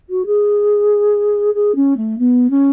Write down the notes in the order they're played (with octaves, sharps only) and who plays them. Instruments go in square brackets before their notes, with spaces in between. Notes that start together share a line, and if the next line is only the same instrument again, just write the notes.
[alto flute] F#4
G#4
G#4
C#4
A3
B3
C#4